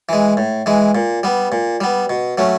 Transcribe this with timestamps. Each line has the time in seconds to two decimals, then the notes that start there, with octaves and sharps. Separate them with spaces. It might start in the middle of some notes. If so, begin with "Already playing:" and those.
0.09 E3 G#3
0.37 A2
0.66 E3 G#3
0.95 A#2
1.23 G3 B3
1.52 A#2
1.81 G3 B3
2.10 B2
2.38 F#3 A3 C#4